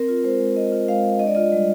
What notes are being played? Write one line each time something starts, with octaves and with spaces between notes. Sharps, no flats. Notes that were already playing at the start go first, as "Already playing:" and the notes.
Already playing: C4 A#4
F4
G#3 C5
G#3
C4 D#5
F4
G#3 F5
G#3
D4 D#5
D5
F4 D#5
G3